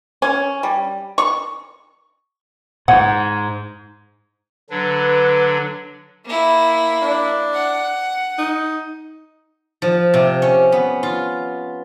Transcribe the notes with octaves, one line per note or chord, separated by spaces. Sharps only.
C#4
G3
C#6
G#2 F#5
D3 F#3 D4 B4
A#3 E4
D4
F#5
D#4
F3
C3
C#4
B3
F4